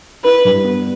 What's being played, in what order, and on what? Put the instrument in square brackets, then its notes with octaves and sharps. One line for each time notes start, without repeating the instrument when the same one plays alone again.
[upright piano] E4 [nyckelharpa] B4
[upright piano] G2
B3